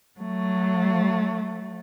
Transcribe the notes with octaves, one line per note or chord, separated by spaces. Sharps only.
F#3 A3